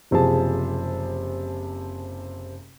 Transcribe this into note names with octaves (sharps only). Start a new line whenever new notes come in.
F#1 C3 F3 G#4 A5